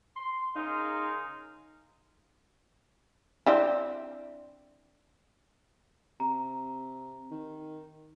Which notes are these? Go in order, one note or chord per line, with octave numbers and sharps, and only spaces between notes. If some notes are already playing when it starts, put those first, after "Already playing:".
C6
C#3 D#4 G#4 A#4 F5 C6
C4 D4 E4
C3 A#5
D#3